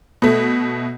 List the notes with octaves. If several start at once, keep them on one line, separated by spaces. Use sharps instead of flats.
B2 A3